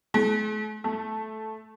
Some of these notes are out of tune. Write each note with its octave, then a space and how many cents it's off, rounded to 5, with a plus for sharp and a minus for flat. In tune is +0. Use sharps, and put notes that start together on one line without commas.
A3 -45
A3 -5